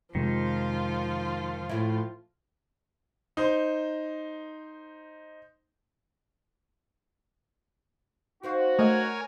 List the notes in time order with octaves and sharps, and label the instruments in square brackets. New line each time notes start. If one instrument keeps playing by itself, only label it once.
[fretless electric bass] F2 C3 G#3 [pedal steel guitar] D#3 [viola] F3 F4
[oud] A2 E4
[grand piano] D#4 C5
[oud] C4 C5 F5 [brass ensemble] D#4 F#4
[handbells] A3 D#5 [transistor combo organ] A#4 C#5 G#5